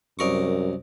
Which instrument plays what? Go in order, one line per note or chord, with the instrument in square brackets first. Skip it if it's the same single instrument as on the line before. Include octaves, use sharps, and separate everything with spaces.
[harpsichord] C2 A#4 C#6 [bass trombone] F#2